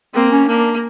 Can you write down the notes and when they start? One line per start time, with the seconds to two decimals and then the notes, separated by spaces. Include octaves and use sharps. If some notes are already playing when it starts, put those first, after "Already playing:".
0.14 A#3 C4
0.31 C#4
0.47 A#3 D4